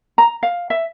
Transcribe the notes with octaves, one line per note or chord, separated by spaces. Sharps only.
A#5
F5
E5